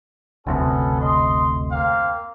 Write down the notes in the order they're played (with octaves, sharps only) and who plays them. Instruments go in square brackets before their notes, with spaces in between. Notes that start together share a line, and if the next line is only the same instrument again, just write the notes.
[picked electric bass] F#1 D2 C3 [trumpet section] B3 C#4 A4
[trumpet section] D#5 C6
A#3 C4 F5